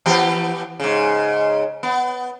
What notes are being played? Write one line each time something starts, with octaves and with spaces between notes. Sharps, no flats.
E3 B3 G4
G#2 C#3
B3